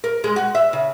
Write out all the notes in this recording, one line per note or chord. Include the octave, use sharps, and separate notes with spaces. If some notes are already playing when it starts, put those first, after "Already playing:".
A#4
G#3
F#4
E5
C#3